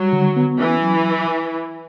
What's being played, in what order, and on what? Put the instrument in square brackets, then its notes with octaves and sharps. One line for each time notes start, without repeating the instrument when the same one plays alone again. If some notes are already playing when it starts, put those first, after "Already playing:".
Already playing: [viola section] F#3 [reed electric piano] G3
[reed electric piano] D3
B3
[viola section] E3 [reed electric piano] C#4
[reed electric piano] F#3